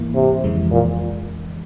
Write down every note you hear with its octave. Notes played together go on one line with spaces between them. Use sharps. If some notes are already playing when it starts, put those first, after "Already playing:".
Already playing: G#2 E3 A#3 E4
C3
F2 C#3 E3 G#3
A#2